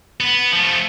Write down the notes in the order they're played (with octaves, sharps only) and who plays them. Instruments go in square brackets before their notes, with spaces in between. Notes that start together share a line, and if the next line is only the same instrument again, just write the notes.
[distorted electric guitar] B3
F3 A3